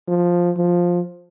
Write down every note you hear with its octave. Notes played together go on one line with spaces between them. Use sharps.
F3
F3